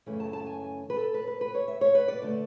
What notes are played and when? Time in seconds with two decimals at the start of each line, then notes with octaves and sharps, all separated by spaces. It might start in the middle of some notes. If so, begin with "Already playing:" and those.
0.06 F#2 C#3 E3 A3 C#4
0.20 A5
0.33 A5
0.46 G#5
0.60 G#5
0.90 B4
0.96 A4
1.14 B4
1.27 B4
1.41 B4
1.55 C#5
1.68 E5
1.81 C#5
1.95 B4
2.08 D5
2.22 D3 A3 D5